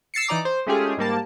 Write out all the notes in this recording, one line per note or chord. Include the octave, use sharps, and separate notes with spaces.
E6 A6 C7 C#7
E3 D#4 D5 A#5 D6
C5
G#3 A3 C#4 F4 G4 G#4
G#2 G3 A#3 A5